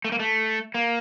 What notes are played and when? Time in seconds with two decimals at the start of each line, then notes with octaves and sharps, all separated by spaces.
0.05 A3
0.12 A#3
0.19 A3
0.75 A#3